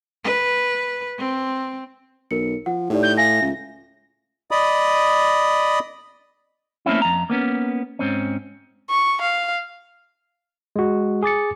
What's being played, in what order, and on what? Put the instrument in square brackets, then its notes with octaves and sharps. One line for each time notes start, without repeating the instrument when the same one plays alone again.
[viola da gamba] B4
C4
[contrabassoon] B1 [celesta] A#4 C#7
[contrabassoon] F3 [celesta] F#5
[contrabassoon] A2 [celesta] D#4 G4 D5
[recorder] G6
[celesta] E5 F5 G#5 [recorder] A#6
[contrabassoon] C#2
[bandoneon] D5 D#5 B5 D#6
[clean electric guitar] A3 A#3 C4 C#4 E4
F2 A#5
A#3 B3 C#4
G#2 C4 C#4
[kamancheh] C#6
F5
[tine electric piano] G#3 F#4
G#4 D6 A6 C#7